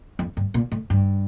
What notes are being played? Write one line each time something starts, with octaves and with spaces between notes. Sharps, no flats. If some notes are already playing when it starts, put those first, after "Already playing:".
F2
G2
A#2
A2
G2